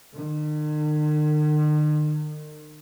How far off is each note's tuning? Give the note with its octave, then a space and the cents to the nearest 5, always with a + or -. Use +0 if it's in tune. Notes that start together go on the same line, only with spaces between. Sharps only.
D#3 -45